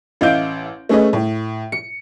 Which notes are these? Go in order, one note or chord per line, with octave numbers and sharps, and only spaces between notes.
A1 E4 D#5 F5 G6 D7
A3 C#4 G#4 B4 D#5
A2
C#7